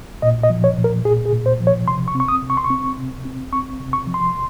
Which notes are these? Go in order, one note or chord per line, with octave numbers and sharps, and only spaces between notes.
A#2 D#5
D#5
F3
C#5
A#2
A#4
A#2 G#4
G#4
A#2
C5
F3
C#5
C3 C6
C#6
C4
C#6
D#6
C3
C#6
C6
C#6
C4
C3
C4
C4 C#6
C3
C#6
F3
C6